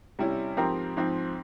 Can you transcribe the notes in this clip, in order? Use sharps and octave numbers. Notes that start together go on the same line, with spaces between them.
C3 G3 C#4 E4
G#2 F3 C4 G4 A#4
G#2 F3 C4